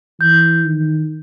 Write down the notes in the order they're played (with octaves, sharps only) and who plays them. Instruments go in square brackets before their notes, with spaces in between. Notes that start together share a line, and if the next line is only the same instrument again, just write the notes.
[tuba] E3 [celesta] G6
[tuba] D#3